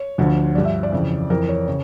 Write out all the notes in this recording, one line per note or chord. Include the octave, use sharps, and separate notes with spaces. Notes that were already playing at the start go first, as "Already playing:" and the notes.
Already playing: C#5
D2 D3 F3
G2 F3 D5
E5
D5
F2 C#3 E3
F2 E3 A#4
C#5
C#3 C#5